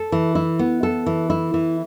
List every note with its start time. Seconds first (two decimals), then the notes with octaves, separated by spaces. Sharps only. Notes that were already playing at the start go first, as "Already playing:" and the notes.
Already playing: A4
0.12 E3
0.35 E4
0.59 B3
0.83 A4
1.06 E3
1.30 E4
1.54 E3